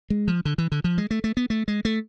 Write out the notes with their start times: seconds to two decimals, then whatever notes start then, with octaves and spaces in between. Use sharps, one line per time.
0.10 G#3
0.28 F3
0.45 D3
0.58 E3
0.72 D3
0.84 F3
0.98 G#3
1.11 A3
1.24 A3
1.37 B3
1.50 A3
1.68 G#3
1.85 A3